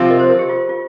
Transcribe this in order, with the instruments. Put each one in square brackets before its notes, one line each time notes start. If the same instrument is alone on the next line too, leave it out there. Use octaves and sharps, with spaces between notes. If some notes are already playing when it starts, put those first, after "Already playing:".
Already playing: [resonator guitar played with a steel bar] C3 F3 C4 F4
[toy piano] A#4 D#5
C5
A#4
G4
F4
F4